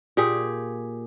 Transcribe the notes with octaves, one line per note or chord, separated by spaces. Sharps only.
A#2 G4 G#4